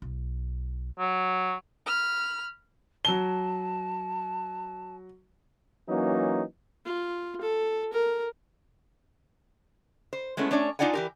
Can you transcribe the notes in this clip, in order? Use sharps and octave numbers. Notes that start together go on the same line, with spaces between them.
B1
F#3
B5 F6
F#3 A5 G7
E3 F#3 A#3 C#4 D#4
F4
A4
A#4
C5
G#3 A3 B3 C#4 E4
A3 C#4 D4 C#5 D5
D4 D#4 F4 D5 F#5 G#5
E3 G4 A#4